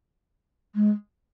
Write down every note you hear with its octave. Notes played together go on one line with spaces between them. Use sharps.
G#3